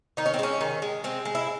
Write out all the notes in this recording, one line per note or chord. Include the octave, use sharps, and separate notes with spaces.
D#3 D#4
C#4
C4
G#3 C#4
D#3
G#3
G#3 C4
G#3
E4